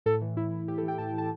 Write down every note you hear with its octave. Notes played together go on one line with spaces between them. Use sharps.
A2 A4
E3
A2 E4
E3
A2 G4
A4
E3
G5
A2 A5
E3 A5